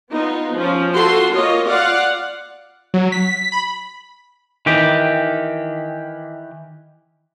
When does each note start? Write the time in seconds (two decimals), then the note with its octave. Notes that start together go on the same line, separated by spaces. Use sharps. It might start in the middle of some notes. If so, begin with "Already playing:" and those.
0.12 B3 D#4 F4
0.56 F3 C#4
0.93 F4 F#4 A4 C6
1.34 A#3 F4 C#5 D#5
1.67 F4 D5 F5 F#5
2.94 F#3
3.12 B6
3.52 B5
4.66 D#3 E3 G4